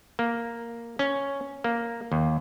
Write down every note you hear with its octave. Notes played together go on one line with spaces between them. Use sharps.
A#3
C#4
A#3
D#2